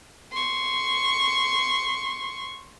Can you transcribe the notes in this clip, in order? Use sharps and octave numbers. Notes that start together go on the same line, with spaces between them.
C6 C#6